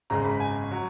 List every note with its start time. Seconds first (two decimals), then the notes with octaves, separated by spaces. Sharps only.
0.10 G#1 F#2 C#3 G#3 A#5
0.25 B5
0.40 G#5
0.71 F#3